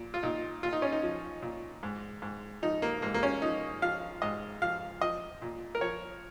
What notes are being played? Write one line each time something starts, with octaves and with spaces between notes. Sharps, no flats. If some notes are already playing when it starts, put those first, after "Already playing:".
Already playing: A#2
F4
A#2 D#4
A#2 F4
D#4
C#4
D#4
F3
A#2
G#2
G#2
F3 D#4
A#3
G#2 A#3
A#3
C#4
F3 D#4
F3 F5
G#2 D#5
F3 F5
F3 D#5
A#2
A#4
F3 C#5